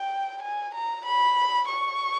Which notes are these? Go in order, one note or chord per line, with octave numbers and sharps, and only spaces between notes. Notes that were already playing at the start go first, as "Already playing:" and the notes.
Already playing: G5
G#5
A#5
B5
C#6